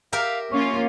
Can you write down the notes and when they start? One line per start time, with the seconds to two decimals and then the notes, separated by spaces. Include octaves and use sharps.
0.13 G4 A#4 E5 F5
0.52 A#3 C#4 F4 C#6